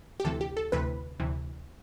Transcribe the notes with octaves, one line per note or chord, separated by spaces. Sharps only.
G4
D2 C3 E3 A4
G4
A4
D2 C3 E3 B4
D2 C3 E3